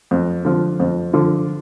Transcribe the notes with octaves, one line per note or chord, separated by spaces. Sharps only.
F2
D3 F3
F2
D3 F3